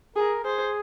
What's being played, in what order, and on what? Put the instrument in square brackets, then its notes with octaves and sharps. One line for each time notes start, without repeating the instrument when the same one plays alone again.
[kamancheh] G#4 [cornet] A#4
[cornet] G#4 [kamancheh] C5